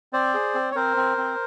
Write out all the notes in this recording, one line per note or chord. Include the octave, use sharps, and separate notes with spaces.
C4 C5 D5
G#4
C4
C#5
C4 A#4 C5
C4
C4